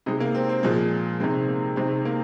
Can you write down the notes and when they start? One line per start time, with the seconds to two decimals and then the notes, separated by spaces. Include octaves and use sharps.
0.06 C3 G#3 D#4
0.20 A#3
0.35 C4
0.49 C4
0.63 A#2 F3 G#3
1.20 C3 D#3 G#3 C4
1.48 A#3
1.76 C3 D#3 G#3 C4
2.05 A#3